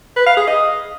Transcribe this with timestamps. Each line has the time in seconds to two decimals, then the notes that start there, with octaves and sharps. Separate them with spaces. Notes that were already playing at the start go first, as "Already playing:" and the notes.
0.16 B4
0.27 F5
0.37 G#4
0.47 D#5